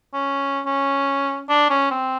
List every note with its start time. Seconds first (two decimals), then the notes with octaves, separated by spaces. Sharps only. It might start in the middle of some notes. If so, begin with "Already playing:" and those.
0.14 C#4
0.66 C#4
1.49 D4
1.70 C#4
1.91 C4